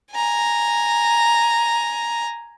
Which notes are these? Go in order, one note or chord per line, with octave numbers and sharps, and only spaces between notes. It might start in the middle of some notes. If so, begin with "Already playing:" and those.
G#5 A#5